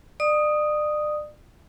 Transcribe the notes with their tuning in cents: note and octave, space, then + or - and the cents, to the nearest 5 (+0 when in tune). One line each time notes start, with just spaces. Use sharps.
D5 +35 D#6 +0